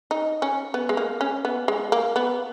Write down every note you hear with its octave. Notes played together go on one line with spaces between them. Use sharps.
D#4
C#4
B3
G#3
A#3
C#4
B3
G#3
A#3
B3